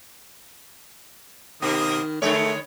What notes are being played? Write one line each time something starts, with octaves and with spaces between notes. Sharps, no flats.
B2 D#3 A#3 D#5 D#6
D3 D#3 G#3 A3 C#5